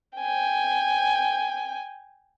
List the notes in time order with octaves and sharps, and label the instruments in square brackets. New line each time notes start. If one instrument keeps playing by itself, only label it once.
[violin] G5 G#5